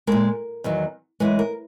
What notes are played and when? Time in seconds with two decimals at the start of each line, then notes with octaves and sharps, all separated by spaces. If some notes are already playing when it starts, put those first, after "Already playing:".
0.07 A#2 G#3 A#4
0.64 E2 D#3 F#3
1.20 F#2 E3 G#3 B4
1.39 A#4